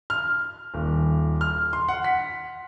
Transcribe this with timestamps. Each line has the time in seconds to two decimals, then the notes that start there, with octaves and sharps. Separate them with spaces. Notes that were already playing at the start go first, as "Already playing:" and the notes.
0.10 F6
0.74 D#1
1.41 F6
1.73 C6
1.88 F#5
2.04 B6